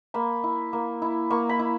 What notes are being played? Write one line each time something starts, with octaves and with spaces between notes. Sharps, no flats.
A#3 B5
E4
A#3
E4
A#3 C#6
B5
E4